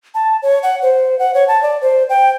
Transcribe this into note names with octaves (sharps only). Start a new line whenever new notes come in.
A5
C#5
F#5
C5
F#5
C#5
A5
D5
C5
G5